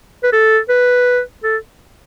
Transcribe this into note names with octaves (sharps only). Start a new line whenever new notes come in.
B4
A4
B4
A4